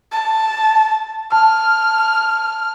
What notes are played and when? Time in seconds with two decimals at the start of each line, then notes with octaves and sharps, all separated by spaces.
0.12 A5
1.32 A5 F6